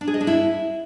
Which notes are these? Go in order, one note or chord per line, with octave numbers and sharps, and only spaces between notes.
D4
G#4
D#5
D4
E4